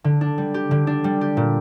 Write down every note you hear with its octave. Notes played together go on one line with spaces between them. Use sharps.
D3
D4
G3
G4
D3
D4
G3
G4
A#2